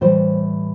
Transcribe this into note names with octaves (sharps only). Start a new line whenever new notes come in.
A2 E3 G3 C5